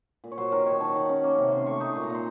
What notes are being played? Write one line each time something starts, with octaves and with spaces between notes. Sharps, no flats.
A#2
C#5
F#3 C5
D#3 A#4
D#3 C#5
D#3 A5
D#3
C#4
A#3
C3
C3 C6
A3 C#6
D#4 C#6
A#2 C6
A#5
A#2 C6